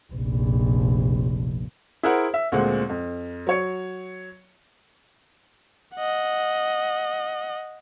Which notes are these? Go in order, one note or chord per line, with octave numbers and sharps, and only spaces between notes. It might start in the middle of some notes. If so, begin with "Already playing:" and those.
F1 A#1
E4 G#4 A#4 C5 F#5
E5
D2 A#2 G#3 C4 F#5
F2
F#3 C#5 C#7
D#5 F#5